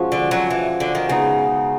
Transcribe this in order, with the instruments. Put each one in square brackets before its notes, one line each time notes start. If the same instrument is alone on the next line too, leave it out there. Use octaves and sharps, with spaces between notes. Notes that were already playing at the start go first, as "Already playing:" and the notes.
Already playing: [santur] F3 G#3 C#4 F#4
[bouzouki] D3
F#3
E3
D3
D#3
[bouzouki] C#3 [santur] G#3 B3 D#4